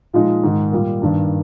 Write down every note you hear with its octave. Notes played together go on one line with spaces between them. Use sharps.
A#2 F3 G#3 D#4
G#2 D#3 G#3 D#4
A#2 G3 A#3
G2 D#3 A#3 D4